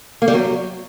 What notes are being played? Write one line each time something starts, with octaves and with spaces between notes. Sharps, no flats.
A#3
G3
F#3